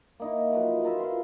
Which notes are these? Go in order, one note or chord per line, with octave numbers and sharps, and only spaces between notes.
A#3 D#4 E4
F3 F#3 B4
F4 A#4 B4 E5
F4 C6